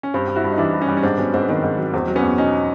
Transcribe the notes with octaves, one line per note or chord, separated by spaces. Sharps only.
C#4
G2 C4
G3
E4 F#4
G2
D#4
E3 D4 E4
G2
C#4 D#4
G3
C#4
G#2 C4 D4
F#3 B3 C#4
G#2 C4
B3
D#3 C4
G#2
F#3
E2 C4
F#3
B3 C#4
E2
B2 C#4 D#4